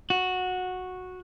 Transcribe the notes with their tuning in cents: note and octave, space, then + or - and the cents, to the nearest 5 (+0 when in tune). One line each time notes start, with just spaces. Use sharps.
F#4 -10